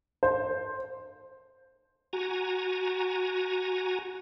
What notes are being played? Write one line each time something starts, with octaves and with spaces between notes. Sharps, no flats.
C5
F#4 G#5 A#5